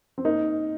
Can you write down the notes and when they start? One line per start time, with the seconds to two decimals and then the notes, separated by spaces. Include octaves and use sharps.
0.18 C4
0.25 A#3 D#4